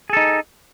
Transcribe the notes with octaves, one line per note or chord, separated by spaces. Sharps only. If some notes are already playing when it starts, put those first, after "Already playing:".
D#4 G#4 A4